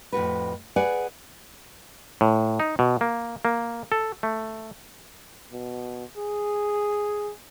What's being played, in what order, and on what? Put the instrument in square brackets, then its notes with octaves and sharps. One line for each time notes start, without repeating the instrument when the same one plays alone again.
[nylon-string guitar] F2 A2 F#4 B4
G#4 B4 D5 F#5 G#5
[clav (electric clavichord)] A2
D#4
B2
A#3
A#3
A4
A3
[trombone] B2
G#4